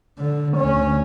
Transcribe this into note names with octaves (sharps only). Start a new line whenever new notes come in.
D3
D2 C#4